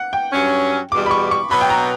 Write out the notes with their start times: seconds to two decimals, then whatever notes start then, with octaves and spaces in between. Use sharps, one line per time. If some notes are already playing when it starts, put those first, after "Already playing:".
Already playing: F#5
0.13 G5
0.33 G2 F#3 C#4
0.92 E2 B2 G3 D6
1.06 B5
1.11 C#6
1.31 C#6
1.51 B2 F#3 B3 B5
1.61 G5
1.70 A#5